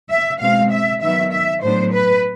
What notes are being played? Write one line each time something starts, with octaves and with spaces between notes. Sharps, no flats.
E5
B2 G#3 C4 F5
E5
D#3 F#3 B3 E5
E5
A2 F#3 B3 D4 C5
B4